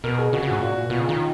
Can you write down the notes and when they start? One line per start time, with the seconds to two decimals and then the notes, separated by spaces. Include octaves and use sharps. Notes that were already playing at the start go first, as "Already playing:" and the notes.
0.04 B2 A#4
0.18 G#4
0.33 C#3 F#4
0.43 C#3
0.47 G#2 F#4
0.61 A#2 F#4
0.90 B2 F4
1.00 C#3
1.09 D#3